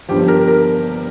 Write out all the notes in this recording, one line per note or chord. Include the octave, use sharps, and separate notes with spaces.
G1 G2 F3 G4
A#4
A#4